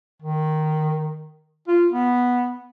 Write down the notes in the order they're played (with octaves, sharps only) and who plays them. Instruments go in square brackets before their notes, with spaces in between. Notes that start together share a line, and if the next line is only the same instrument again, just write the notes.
[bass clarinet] D#3
F4
B3